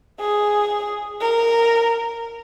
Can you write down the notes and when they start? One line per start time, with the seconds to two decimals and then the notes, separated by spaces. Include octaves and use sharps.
0.20 G#4
1.20 A#4